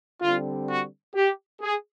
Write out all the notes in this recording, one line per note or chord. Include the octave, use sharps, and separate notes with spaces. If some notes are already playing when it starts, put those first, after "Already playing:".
D3 G3 C4 F4
F#4
G4
G#4